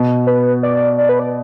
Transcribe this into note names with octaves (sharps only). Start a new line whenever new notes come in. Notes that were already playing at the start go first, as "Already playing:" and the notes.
Already playing: B2
B4
D5
D5
B4
D5